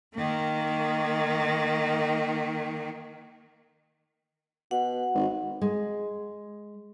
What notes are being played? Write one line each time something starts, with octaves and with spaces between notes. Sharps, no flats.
D#3 A#3
B2 F#5
G#1
G#3